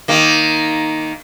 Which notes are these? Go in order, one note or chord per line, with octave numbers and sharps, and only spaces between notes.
D#3 A#3